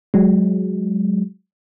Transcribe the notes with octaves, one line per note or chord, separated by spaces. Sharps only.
F#3 G#3